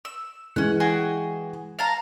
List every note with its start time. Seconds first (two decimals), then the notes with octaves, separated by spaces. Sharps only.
0.05 E6
0.56 E3 G#3 C#4 F#5
0.80 F#4 G#4 G5
1.79 F5 A5 A#5